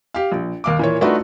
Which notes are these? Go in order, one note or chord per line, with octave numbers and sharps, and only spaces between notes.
G4 F5
A#1
D#2 F5 D6
A#2 E3 C#5
A3 D4 D#4 F4 F#4 B4